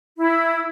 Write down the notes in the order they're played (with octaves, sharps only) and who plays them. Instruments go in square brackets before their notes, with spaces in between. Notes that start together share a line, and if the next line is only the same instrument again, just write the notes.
[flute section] E4